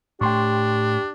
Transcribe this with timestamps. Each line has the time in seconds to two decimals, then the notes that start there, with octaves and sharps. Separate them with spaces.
0.21 A2 A3 D4 G4 G5 C6 C#6